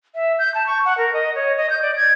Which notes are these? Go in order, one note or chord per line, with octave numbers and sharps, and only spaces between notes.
E5
G6
A5
C#6
F#5
A#4
D#5
C#5
D#5
G6
D5
G#6